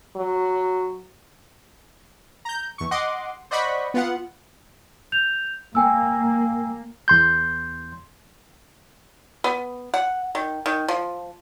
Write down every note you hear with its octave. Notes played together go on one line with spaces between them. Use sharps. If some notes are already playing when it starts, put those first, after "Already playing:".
F#3
A#5 G6
E2 C#6
D#5 F#5 C6 D6
C5 D5 D#5 F#5 B5 C#6
B3 F4 F#5
G6 F7
A#3 G5 G#5 E6
E2 C6 G6
B3
F#5
D#3
D#3
F3